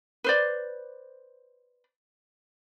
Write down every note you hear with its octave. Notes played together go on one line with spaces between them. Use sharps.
B4 C5 D5